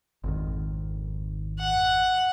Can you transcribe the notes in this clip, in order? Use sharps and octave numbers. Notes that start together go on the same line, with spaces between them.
G#1 F2 D#3
F#5